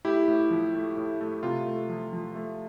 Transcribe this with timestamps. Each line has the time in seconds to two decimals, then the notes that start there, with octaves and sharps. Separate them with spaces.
0.05 A2 E4 G4
0.28 A2
0.51 F3
0.74 A3
0.97 A2
1.21 A3
1.43 C3 F4
1.67 A3
1.89 F3
2.13 F3
2.35 A3